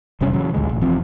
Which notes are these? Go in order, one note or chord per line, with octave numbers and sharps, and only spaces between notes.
E1 C3 G3 C#4
A#2 C#3 E3 F#3
A1 D2 C#3 G#3
A1 A#2
F1 E3 F3 C4